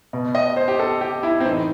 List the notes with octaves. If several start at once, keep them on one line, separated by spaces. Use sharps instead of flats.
B2
D#5
C5
G4
A4
G4
E4
C4
A2 E3 D#4